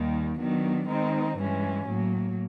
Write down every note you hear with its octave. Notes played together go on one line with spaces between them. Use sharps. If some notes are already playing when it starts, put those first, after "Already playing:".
Already playing: D#2 D#3 G3
D#3 F#3 B3 D4
D#3 G#3 C4 D#4
G2 E3 G#3 C#4
A2 F#3 A#3